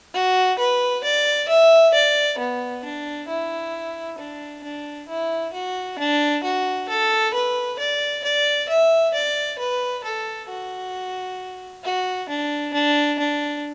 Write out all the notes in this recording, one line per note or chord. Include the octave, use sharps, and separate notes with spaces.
F#4
B4
D5
E5
D5
B3
D4
E4
D4
D4
E4
F#4
D4
F#4
A4
B4
D5
D5
E5
D5
B4
A4
F#4
F#4
D4
D4
D4